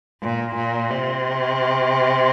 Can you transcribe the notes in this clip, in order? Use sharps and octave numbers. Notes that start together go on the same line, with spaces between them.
A#2
A#2
C3